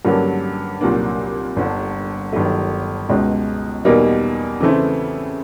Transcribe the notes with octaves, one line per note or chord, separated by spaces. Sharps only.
G2 D3 F#3 A#3 C#4
C2 A#2 F#3 A#3 D4
G1 G2 D3
G1 G2 D#3 F#3 A3
C#2 B2 G#3
E2 B2 G3 A#3 D#4
C#3 E3 A3 C4 E4